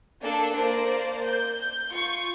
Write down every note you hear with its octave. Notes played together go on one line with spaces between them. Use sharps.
A#3 D4 A4
A#3 A#4 C5 D5
G6
G6
F4 C#6